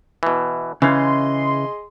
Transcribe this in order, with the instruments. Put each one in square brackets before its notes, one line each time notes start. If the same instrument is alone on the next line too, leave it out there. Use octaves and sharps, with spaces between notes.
[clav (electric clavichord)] B2 E3
[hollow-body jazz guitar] C#3 [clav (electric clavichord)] E3 F5 [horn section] G#4 D#5 C6